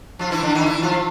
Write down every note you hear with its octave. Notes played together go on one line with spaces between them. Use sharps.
F3 F4
E3 E4
D3 D4
D#3 D#4
E3 E4
F3 F4